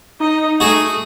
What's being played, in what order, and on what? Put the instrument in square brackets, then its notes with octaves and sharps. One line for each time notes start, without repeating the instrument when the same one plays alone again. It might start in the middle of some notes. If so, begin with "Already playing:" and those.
[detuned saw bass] D#4 [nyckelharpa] D#5
[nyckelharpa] A3 D#6 [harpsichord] F#4 G#4